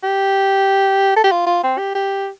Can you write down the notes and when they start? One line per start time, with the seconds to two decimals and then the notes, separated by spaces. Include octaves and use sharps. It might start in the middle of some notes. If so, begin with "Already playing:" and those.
0.03 G4
1.17 A4
1.24 G4
1.32 F4
1.47 F4
1.64 C4
1.78 G4
1.95 G4